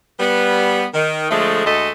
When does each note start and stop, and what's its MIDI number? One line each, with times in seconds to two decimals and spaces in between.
0.20 0.85 55
0.20 0.85 59
0.94 1.27 51
1.31 1.63 50
1.31 1.63 53
1.31 1.63 56
1.31 1.63 57
1.66 1.90 38
1.66 1.90 56
1.66 1.90 57
1.66 1.90 69
1.66 1.90 75